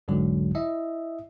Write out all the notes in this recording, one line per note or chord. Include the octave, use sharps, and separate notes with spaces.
B1 E2 G#2 D3 F#3 G#3
E4 D#5 E5